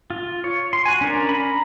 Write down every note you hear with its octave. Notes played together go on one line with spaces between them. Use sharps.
F4
C#5
C6
F#4 G#5
C#4 D4 A#4 D5
A#5 B5